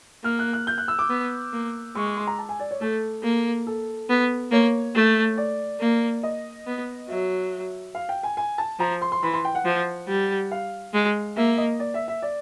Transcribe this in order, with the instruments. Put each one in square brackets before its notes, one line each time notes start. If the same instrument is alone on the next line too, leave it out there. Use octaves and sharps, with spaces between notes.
[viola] A#3 [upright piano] F6
[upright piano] F#6
F#6
G6
F#6
E6
D6
[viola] B3
A#3
[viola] G#3 [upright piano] C#6
[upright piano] C#6
C6
A#5
A5
G#5
D5
C#5
[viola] A3 [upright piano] A4
[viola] A#3
[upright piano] A4
[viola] B3
[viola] A#3 [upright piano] C#5
[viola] A3
[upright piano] D5
[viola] A#3
[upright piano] D#5
[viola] B3
[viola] F#3 [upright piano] E5
[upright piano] F5
G5
G#5
G#5
A5
[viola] F3 [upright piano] A#5
[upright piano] C6
C6
[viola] E3 [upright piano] B5
[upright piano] C6
G5
F#5
[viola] F3
G3
[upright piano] F5
[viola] G#3
[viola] A#3 [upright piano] E5
[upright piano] D#5
D5
E5
E5
D5